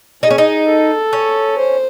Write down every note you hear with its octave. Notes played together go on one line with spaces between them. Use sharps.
D#4 G#4
C#4
D#4
A4
C#4
C5